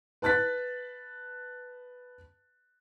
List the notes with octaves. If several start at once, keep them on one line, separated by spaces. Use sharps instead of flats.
B4 A5 F#6 A6 B6